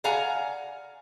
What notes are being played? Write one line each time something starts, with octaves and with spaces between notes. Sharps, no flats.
D5 F5 F#5 G#5 A#5